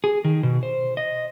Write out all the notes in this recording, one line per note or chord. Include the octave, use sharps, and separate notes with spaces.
G#4
D#3
B2
C5
D#5